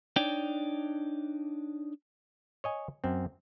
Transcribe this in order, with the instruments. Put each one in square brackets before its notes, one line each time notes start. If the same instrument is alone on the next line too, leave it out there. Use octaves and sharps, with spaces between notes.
[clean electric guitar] D4 D#4 C#5 D5 G5
[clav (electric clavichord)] C#5 D#5 G#5
F#2 C4